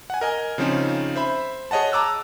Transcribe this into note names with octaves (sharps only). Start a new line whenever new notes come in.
F#5 G#5
A#4 D#5 G#5
C#3 F3 C4 C#4 D#4
C5 E5 B5
G#4 C#5 D#5 F#5 A5
A5 A#5 D6 E6 F#6